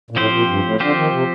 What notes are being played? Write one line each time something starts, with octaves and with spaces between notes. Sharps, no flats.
A#2
A2 F3 C4 G4 C5
A#2
G2
A2
D3 F3 C4 G4 C5
D#3
C3